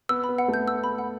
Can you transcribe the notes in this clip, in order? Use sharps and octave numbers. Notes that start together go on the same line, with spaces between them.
B3 E6
B3 B5
F#5
A3
G6
E6
B5
F#5